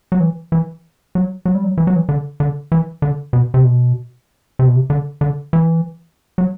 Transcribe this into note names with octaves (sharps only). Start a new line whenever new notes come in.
F#3
E3
E3
F#3
F#3
G3
F#3
E3
F#3
E3
D3
D3
E3
D3
B2
C3
B2
C3
B2
C3
D3
D3
E3
F#3